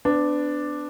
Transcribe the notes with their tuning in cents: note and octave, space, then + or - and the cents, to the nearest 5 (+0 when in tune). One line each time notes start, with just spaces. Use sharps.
B3 +30 D4 +0